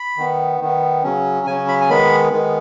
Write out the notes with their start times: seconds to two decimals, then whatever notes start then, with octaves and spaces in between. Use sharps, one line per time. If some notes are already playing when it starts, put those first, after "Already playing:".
Already playing: B5
0.17 D#3 B3
0.60 D#3 B3
1.03 C#3 F#3 C#4
1.46 C#3 F#3 C#4 G#5
1.68 B5
1.81 G#5
1.89 D#3 G#3 B3 B5
2.33 D#3 G#3 B3